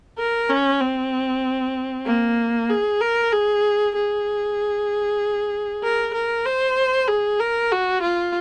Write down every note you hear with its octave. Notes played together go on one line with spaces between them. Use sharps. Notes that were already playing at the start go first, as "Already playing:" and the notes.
A#4
C#4
C4
A#3
G#4
A#4
G#4
G#4
A#4
A#4
C5
G#4
A#4
F#4
F4